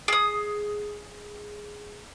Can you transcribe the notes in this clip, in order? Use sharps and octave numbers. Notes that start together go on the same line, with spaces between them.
G#4 D#6